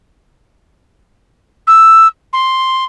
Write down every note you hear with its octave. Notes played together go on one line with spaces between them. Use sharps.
E6
C6